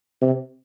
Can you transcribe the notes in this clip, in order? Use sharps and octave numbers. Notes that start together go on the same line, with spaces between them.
C3